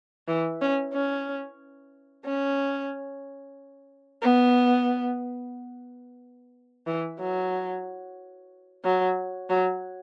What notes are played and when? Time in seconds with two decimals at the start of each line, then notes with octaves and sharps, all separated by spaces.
0.28 E3
0.61 C#4
0.93 C#4
2.25 C#4
4.22 B3
6.86 E3
7.19 F#3
8.84 F#3
9.50 F#3